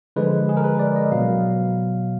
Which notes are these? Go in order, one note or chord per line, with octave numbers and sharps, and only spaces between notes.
D3 F3 G#3 B4
G#4
A#4
B4
D5
D#5
B2 F#3 F5